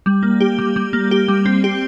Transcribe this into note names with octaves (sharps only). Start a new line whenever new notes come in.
G3
A#3
G4
G3
G3
A#3
G4
G3
C4
G4